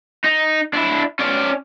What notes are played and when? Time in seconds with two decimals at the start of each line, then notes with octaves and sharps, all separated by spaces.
0.24 D#4
0.74 D4 E4
1.19 C#4 D5